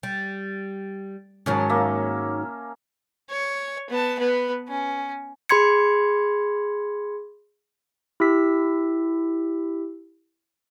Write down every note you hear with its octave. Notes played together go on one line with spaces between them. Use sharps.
G3
G#2 D#3 F#3 C#4 A5
A#3 E5
C#5
B3 A5
B3 B4
C#4
G#4 B5 C6 G#6 C#7
E4 G4 E6 B6